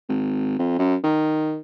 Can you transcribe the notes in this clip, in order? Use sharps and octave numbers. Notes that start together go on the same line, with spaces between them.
G#1
F2
F#2
D#3